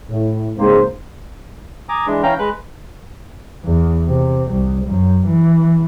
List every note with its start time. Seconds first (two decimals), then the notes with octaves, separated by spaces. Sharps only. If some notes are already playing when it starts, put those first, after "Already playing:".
0.10 A2
0.57 C#2 G#2 G#3 A#3 C4 C5
1.89 G#5 A#5 D6 D#6
2.06 E3 G#3 D4
2.23 E3 C#4 F5 G5 A#5
2.39 G#3 B4 F#6
3.64 E2
4.08 C3
4.51 C2
4.86 F#2
5.27 E3